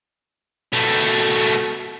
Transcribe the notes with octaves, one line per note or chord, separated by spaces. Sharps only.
B2 A3